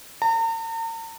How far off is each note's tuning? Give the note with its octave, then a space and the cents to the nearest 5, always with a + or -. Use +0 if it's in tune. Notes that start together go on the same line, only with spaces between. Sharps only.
A#5 -45